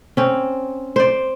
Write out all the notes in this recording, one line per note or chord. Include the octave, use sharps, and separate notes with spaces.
C4 C#4
C5 D5